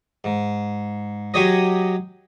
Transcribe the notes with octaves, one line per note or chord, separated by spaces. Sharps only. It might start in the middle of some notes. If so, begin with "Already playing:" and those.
G#2
F#3 G4 G#4 C#5 D#5